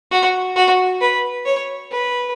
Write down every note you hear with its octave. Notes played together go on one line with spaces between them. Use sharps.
F#4
F#4
B4
C#5
B4